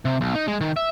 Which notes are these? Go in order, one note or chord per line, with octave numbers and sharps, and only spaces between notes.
C3
B1
D#4
G#3
D#3
E5